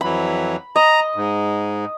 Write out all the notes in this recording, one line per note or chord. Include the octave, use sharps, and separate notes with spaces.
F2 E3 F#3 B5
D#5 A#5
G#2